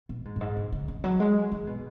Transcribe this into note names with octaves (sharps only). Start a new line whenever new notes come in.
B2
G#2
F#2
G#2
B2
C#3
C#3
F#3
G#3
D#3
B2